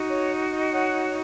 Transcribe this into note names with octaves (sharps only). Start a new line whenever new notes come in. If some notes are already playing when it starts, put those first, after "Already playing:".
Already playing: D#4 F#4
C#5
D#5
C#5 F#5